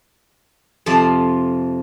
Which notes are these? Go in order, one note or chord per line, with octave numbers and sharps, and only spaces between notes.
F2 C3 F3 D5 C6